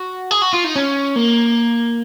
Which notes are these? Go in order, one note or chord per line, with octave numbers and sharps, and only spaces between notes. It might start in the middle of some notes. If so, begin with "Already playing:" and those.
Already playing: F#4
G#4
F#4
F4
D#4
C#4
A#3